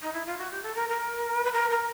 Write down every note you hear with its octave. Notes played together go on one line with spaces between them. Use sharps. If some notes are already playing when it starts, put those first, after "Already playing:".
D#4
E4
F4
F#4
G4
A4
A#4
A#4
B4
A#4
A#4